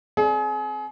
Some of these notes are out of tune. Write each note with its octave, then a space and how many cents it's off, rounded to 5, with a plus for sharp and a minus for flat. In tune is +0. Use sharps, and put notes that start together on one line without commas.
C4 +0 G#4 +35 D5 +0